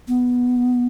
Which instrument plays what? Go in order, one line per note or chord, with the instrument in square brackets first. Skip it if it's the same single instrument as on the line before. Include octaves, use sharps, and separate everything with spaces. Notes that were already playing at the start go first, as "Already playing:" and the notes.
[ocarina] B3